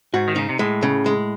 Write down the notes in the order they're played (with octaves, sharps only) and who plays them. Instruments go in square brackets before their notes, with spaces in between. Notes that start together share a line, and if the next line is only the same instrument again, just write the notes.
[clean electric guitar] G#2 [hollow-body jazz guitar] F#4
[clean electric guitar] D#3
[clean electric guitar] C#3 [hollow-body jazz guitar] D#4
[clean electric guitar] C3
[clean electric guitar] A2 [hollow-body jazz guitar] G#3
[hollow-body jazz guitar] C#3
G#3